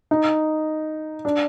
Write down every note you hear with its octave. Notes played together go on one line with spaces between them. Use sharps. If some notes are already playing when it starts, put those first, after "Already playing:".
D#4
D4